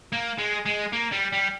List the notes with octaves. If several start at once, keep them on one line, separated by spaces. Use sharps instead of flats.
A#3
G#3
G#3
A#3
G3
G3